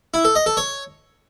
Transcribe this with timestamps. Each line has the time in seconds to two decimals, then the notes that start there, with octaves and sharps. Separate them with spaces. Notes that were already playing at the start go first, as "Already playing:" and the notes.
0.14 E4
0.25 A4
0.35 D#5
0.46 A4
0.57 C#5